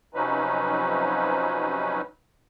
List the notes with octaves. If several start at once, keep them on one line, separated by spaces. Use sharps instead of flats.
C3 F3 F#3 C#4 D#4 B4